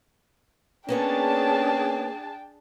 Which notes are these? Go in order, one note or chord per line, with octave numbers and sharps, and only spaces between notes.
A#3 B3 C#4 D4 G#4 C#5 G5 A5